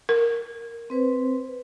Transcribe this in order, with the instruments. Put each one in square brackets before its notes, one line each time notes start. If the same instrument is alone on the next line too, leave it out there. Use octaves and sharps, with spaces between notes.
[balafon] A#4
[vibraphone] C4 B4 C5